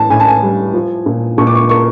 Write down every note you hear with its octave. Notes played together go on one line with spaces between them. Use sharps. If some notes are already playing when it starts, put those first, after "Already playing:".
Already playing: A2 E3 A5
A2 G#5
A5
G#5
G3
F3
A#2
A#2 C#6
D6
C#6
A#3 C#6